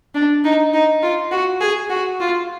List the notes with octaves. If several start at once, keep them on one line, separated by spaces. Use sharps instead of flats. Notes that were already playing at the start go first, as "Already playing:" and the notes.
D4
D#4
D#4
F4
F#4
G#4
F#4
F4